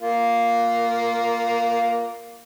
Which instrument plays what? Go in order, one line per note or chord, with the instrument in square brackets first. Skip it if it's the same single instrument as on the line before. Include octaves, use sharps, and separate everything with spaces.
[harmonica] A#3 F4